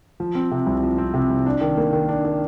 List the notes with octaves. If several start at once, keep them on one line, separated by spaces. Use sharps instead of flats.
F3
C4
C3
C2
F3
C4
C3
C2
D4
D#3
A#3
D#3
D4
D#3